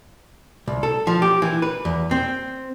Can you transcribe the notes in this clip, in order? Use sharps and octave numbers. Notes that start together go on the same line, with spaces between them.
C2
A4
F3
G4
E3
B4
E2
C4